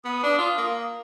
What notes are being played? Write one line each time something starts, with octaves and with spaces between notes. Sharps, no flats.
B3 D#6
D4
F4
A#3